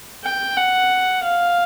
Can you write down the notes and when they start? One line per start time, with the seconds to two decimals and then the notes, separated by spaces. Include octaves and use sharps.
0.24 G5
0.57 F#5
1.23 F5